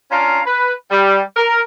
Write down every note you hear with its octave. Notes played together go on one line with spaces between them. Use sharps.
C#4 D4 F4 F5 A#5
B4
G3
A#4